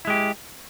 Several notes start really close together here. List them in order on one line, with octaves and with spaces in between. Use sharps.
E4 G#3 G4